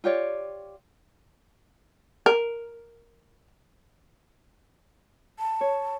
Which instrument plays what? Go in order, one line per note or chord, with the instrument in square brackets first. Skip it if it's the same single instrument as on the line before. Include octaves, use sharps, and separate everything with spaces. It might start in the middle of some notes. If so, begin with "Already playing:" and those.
[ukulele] F4 G4 C#5 D5
[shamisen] A#4
[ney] A5
[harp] C#5